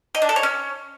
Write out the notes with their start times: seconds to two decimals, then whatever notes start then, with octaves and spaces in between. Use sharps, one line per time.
0.15 D#5
0.22 D4
0.29 A4
0.36 C#5
0.43 C#4